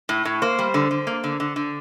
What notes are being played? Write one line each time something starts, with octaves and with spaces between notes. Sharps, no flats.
A2
A2
A#3 C5
G3
D3
D3
A#3
D3
D3
D3